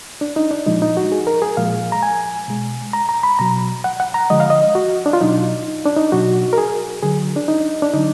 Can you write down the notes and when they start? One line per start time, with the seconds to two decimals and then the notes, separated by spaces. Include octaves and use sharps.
0.21 D4
0.36 D#4
0.51 D4
0.66 A#2 F3 G#3 D#4
0.82 D#4
0.97 F#4
1.12 G#4
1.27 A#4
1.42 G#4
1.57 A#2 F3 G#3 F5
1.92 A#5
2.03 G#5
2.48 B2 G#3
2.93 A#5
3.09 A#5
3.23 B5
3.39 B2 F#3 A#5
3.84 F#5
4.00 F#5
4.14 A#5
4.30 D3 F3 G#3 D#5
4.40 F5
4.50 D#5
4.75 F#4
5.06 D4
5.13 F4
5.21 B2 F#3 D#4
5.86 D4
5.96 D#4
6.12 B2 F#3 F#4
6.53 A#4
6.58 G#4
7.03 D3 F#3 G#4
7.36 D4
7.48 D#4
7.82 D4
7.93 D3 F#3 D#4